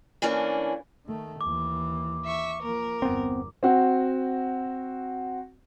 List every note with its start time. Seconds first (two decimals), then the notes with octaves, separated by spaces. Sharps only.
0.22 E3 A3 A#3 C#4 D4
1.06 D#3 A3
1.41 D#2 E3 D6
2.26 E5 C#6
2.62 F3 A#3 A#4
3.02 G1 E2 B3 C4
3.63 C4 F#4